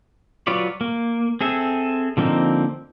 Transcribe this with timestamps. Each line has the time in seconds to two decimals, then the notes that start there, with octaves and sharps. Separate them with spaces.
0.47 F#3 F4 B4 C#5 D5
0.81 A#3
1.41 C4 G#4 A4 E5
2.17 D3 F3 A#3 C4 D#4